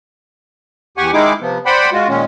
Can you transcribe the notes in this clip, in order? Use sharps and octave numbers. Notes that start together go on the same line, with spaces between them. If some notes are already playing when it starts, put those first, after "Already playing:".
E2 G4 F#5 G#5 C#6
D#3 G#3 D#4 E4 G#4 D6
C3 F3 B3
C5 D5 F#5 G5 B5
G#3 F4 F#4
A#2 D#3 G#3 C#4